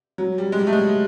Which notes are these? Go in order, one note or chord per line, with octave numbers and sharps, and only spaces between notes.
F#3
G3
G#3
G3
A3
G#3